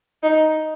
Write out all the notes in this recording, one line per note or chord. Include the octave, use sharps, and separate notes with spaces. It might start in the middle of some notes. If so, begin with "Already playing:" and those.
D#4